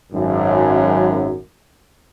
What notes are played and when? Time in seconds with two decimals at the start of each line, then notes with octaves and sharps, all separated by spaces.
0.13 G#1 F#2